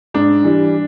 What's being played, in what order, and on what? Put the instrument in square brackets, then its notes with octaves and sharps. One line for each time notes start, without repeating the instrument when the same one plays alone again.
[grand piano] G#2 [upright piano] D4
[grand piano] E3 G3